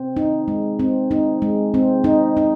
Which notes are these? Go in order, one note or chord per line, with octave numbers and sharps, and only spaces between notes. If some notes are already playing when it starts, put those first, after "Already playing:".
Already playing: C4
D#4
G#3
C4
D#4
G#3
C4
D#4
D#4